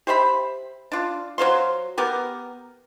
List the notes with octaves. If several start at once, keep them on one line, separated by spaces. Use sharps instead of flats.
G4 C5 E5 B5
D4 F4
F#3 C5 F5 C6
B3 G4 A#4